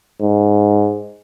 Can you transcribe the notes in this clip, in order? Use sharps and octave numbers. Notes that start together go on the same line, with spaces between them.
G#2